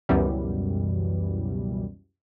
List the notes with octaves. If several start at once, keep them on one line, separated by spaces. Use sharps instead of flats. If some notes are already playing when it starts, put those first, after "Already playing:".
C#2 F#2 B2 E3 G3